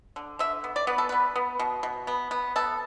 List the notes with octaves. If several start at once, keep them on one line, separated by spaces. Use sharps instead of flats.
D3
D3 E5
B3
D5
B3 B4
A4
B3 B4
B3
B2
B2
B3
B3
B3 A4